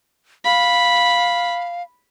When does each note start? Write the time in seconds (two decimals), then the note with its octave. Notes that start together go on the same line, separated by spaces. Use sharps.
0.45 F5 B5